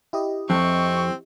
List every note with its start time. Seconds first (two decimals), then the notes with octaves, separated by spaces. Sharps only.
0.13 E4 G4 D#5
0.50 F2 C4 C#6